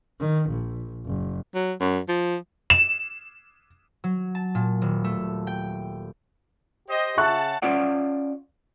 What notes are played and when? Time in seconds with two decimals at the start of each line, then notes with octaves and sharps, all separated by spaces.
0.19 D#3
0.50 A#1
1.05 F#1
1.55 F#3
1.80 F#2
2.08 F3
2.70 E7
4.04 F#3
4.35 A5
4.55 A#2
4.82 D#1
5.04 A3
5.47 G5
6.89 G4 C5 D#5
7.17 C#3 E5 F#5 A5 C#6 F#6
7.62 C#4 F4 D5 F#5